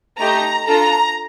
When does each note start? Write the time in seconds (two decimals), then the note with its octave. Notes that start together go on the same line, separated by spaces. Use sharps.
0.19 A3 D#4 G4 A#5
0.66 D4 F4 A4 A#5